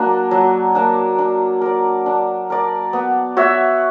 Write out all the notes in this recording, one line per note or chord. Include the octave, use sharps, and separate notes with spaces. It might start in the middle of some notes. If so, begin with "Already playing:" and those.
Already playing: F#3 A#3 D4
F#3
A#3 D4
D4
A#4 D5
D4
A#4 D5
B3
F#4 C#5 E5